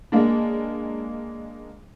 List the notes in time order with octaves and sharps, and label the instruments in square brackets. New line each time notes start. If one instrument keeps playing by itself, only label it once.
[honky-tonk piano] G#3 A#3 D4